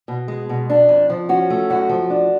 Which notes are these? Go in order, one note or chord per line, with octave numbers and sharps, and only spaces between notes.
B2
G#3
B2
D4
F2
F3
C#4 F#4
A3
F#2 F#4
F3
D4